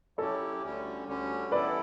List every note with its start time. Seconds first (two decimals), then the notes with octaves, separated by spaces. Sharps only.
0.18 F#3 C#4 E4 G4 A4 C#5
0.63 D2 D3 G3 C#4
1.08 D2 D3 G3 C#4
1.51 E3 G3 B3 E4 A4 B4 D5